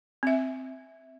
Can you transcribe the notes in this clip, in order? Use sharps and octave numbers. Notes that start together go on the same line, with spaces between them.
C4 E5